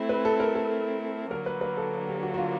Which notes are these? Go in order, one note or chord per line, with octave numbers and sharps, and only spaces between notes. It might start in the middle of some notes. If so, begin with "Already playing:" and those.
Already playing: A3 C4 E4
B4
A4
A#4
A4
D3 F#3 A#3 A#4
B4
B4
A4
G4
F#4
F#4
F4